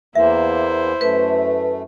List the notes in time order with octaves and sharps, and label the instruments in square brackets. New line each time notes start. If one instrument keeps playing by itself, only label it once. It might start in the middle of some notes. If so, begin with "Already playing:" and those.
[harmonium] E2 E3 A#3 [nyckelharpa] E4 C5 [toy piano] E5
[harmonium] F#2 A3 [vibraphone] B4